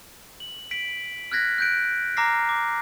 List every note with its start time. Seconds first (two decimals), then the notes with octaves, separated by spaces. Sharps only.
0.40 F#7
0.71 B6 D7 F#7
1.32 F6 F#6 G#6 A#6 B6
1.58 F#6 G6 D7
2.17 A#5 D6 F6 A#6 C7
2.49 D6